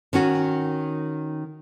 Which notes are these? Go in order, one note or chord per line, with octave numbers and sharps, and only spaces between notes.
D#3 C#4 F#4